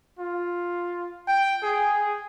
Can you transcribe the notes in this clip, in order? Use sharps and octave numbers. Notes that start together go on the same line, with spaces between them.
F4
G5
G#4